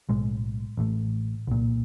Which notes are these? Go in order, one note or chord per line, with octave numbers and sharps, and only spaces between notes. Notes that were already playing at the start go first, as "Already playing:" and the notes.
B1 A2 G#3
A1 A2
C2 A#2